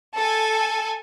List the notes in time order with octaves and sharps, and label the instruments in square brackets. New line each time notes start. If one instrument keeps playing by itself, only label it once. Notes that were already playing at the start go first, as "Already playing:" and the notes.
[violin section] A4 G#5